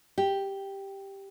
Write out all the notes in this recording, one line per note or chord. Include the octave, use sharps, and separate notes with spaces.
G4